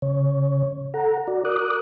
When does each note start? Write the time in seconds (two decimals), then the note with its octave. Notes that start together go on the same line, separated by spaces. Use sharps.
0.02 C#3 C#5
0.94 A4 F#5 A#5
1.27 F#4 D5
1.45 A#4 D6 D#6 F#6